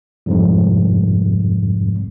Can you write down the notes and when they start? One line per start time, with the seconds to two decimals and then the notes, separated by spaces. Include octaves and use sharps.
0.26 C2 F2 G#2